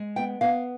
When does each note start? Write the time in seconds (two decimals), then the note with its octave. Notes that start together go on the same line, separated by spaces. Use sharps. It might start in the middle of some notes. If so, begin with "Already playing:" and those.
Already playing: G#3
0.16 B3 G5
0.41 B3 F5